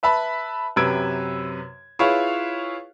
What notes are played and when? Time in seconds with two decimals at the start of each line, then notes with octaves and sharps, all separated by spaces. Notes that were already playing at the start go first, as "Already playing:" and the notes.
0.03 B4 E5 A5 B5
0.76 F#2 C3 B4 E6 G#6 D7
1.99 E4 F4 G#4 B4 C#5 F5